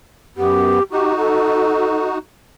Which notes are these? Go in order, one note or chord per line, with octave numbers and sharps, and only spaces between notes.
F#2 B3 G4
D#4 F#4 G4
A4